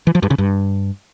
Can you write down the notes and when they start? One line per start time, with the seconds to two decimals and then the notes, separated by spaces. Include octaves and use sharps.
0.07 E3
0.15 F3
0.23 G2
0.30 C#3
0.38 G2